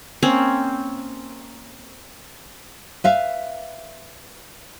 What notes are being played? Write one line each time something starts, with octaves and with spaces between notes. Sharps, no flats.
A#3 C4 C#4
B4 E5 F5